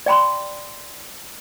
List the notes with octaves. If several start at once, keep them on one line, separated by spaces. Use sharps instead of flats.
D5 G5 B5 C6